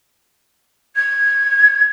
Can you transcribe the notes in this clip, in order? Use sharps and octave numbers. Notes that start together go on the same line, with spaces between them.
G#6